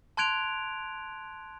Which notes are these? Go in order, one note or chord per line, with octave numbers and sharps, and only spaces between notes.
A5 C6 F#6 G#6 D7 F7